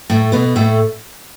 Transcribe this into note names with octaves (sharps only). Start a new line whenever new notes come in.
A2 A3
B2 B3
A2 A3